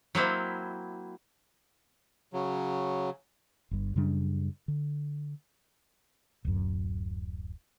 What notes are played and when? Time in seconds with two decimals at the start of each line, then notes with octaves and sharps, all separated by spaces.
0.15 F#3 A#3 C4 E4
2.33 C#3 F#3
3.71 G1 G2
3.96 F#2 C#3 G3 D4
4.68 D3
6.45 D1 F#2